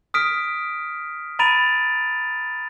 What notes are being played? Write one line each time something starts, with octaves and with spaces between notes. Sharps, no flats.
D#6 F6 B6 D7
A#5 B5 A6 D7 D#7 F7